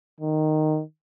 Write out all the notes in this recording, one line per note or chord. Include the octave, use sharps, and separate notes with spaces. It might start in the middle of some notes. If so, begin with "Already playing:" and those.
D#3